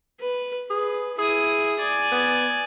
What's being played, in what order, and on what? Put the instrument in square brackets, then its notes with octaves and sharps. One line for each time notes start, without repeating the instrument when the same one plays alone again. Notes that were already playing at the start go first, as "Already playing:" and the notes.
[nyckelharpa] B4
[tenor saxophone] G#4 [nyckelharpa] B4
[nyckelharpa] E4 D#6 [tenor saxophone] G#4
[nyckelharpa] D5 G#5
[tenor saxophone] B3